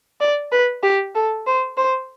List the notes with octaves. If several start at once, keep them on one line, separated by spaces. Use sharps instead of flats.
D5
B4
G4
A4
C5
C5